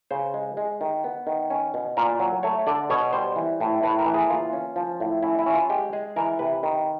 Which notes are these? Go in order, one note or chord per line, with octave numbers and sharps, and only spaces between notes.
C#3 C5
G#3
G#3
D#3
B3
D#3
C#4
B2
A#2 A#4
F#3
A3 C#5
D3 D5
B2 C#5
G3 C5
E3
A2
A2 B4
A#4
E3
G#4
A#3 F4
C#4
F3
A2
C#4 E4
E4
C#4
F4
G#3 G4
G#3 G#4
E3 A#4
C3 B4
D#3